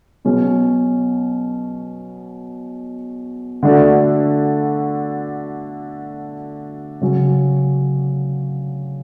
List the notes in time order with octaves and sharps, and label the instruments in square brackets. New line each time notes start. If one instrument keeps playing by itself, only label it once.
[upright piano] B2 F#3 C#4 G#4
D3 A3 D4 F#4 A4
C#3 F#3 C#4